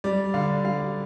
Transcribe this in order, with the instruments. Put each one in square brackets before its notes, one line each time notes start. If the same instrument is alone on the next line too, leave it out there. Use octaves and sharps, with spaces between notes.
[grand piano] G3 D5
D3 F5
G3 F5